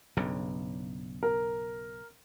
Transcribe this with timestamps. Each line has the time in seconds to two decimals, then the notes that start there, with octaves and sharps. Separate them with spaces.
0.17 B1 G2 C#3
1.23 A#4